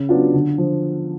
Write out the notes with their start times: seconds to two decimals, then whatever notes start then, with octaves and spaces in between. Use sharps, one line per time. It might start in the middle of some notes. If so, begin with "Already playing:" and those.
Already playing: C#3
0.09 F#3 B3 D4 F4
0.34 D3
0.58 F3